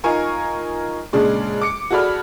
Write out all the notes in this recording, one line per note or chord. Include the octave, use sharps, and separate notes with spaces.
D#4 F4 A#4 G#5 C#6
A#2 C#3 G#3 D4
D6 C#7
F#4 G#4 A4 D5 B5 F6